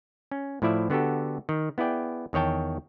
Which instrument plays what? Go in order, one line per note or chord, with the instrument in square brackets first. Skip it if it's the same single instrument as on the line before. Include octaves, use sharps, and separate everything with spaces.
[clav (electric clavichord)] C#4
A2 F3 E4 D5 E5
D3 B3 F#4 G4 A4
D#3
B3 E4 G#4 D5 G5
E2 D#3 C#5 G5 A5